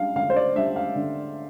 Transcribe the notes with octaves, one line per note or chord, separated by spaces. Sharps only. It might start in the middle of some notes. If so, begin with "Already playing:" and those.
Already playing: G3 D4 F5
D3 F5
C5
D5
G3 D4 E5
F5
D3